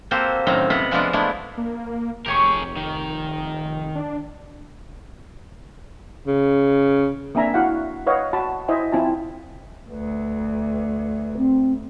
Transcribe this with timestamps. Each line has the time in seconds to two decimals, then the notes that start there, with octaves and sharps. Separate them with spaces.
0.11 A#3 C4 F#4 G4 A4 C5
0.47 F#2 A2 D#3 C4 F5 A#5
0.70 C3 B3 F4 F#5 B5
0.91 F3 G#3 A3 B3 D4 F4
1.13 G#3 A3 B3 D4 E4
1.57 A#3
2.26 F1 G4 G#4 A#4 C#5 C#6
2.77 D#3
3.95 D4
6.27 C#3
7.35 A#3 C4 D4 E5 G#5 A#5
7.54 E4 F#4 F5 F#5
8.07 B4 C#5 D#5 F5 F#5
8.33 F#4 A5 B5
8.68 E4 C5 D#5 E5 G#5
8.92 C4 E4 F4 G#5 A5
9.89 D2 B4
11.37 C4